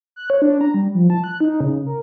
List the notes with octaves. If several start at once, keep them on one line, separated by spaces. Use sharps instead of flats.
F#6
C#5
D4
A#5
G3
F3
A5
F#6
D#4
C#3
A#4